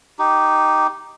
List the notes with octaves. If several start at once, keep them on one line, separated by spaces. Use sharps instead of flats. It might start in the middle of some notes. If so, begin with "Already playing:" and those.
D#4 G4